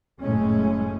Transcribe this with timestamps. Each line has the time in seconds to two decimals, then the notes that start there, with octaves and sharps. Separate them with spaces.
0.19 F#1 A2 G#3 A3 C#4